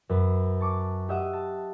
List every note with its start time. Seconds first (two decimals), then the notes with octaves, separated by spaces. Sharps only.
0.09 F#2 B4
0.61 A5 C#6 D6
1.09 G4 D#5 E5 F#5 D#6 E6
1.33 A5